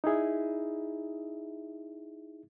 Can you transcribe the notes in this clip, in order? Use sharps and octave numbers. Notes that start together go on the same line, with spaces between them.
D#4 E4 G#4 E5